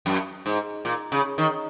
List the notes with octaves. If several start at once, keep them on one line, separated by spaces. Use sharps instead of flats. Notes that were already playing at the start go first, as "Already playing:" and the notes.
F#2
G#2
A#2
C#3
D#3